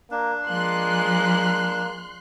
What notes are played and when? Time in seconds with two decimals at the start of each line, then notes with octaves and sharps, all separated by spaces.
0.11 A#3 D4
0.46 F3 G#3 A#3 C6 F#6